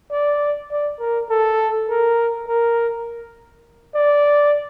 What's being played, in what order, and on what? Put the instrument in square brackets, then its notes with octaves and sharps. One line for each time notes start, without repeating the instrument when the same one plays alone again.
[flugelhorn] D5
D5
A#4
A4
A#4
A#4
D5